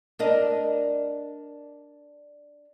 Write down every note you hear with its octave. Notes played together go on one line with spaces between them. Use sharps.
D4 A#4 D#5